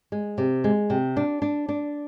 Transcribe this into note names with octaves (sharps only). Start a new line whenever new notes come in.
G#3
C3
G#3
C3
D4
D4
D4